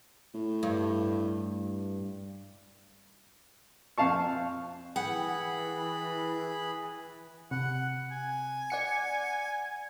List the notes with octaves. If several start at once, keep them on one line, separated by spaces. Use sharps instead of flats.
A2
G2
F2 F5 A5 C#6
E3 G#4 F#5 G5 B5
C3 F#5
G#5
D5 F#5 C#7